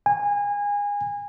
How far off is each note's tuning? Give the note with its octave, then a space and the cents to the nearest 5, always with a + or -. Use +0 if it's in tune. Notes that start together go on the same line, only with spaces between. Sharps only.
G#5 -25